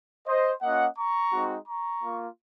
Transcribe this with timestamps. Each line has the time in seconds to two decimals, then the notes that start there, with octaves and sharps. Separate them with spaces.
0.27 C5 D#5
0.62 A#3 C#4 F4 D#5 F#5
0.97 A#5 C#6
1.32 G#3 C4 D#4 F#4
1.68 A#5 C#6
2.03 A#3 F4